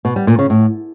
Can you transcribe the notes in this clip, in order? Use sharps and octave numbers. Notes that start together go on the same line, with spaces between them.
B2
G3
A#2
C#3
A2